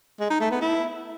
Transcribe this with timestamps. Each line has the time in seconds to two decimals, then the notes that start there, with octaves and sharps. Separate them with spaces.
0.20 G#3
0.30 D#4
0.41 A3
0.51 B3
0.62 E4